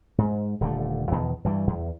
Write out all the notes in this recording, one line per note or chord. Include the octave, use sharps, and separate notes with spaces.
G#2
D#1 D3 A3
E2 B2 D#3
G2 E3 G3
E2